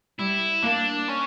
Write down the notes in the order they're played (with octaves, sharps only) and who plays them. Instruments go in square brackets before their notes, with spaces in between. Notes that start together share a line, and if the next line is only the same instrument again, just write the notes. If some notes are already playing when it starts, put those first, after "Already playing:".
[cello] G3 [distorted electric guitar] E4
[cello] A#3 [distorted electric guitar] D4
[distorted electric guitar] C#4